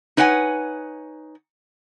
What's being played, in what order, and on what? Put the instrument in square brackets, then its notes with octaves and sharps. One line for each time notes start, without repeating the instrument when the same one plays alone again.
[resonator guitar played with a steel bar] D#4 B4 C#5 F#5 G#5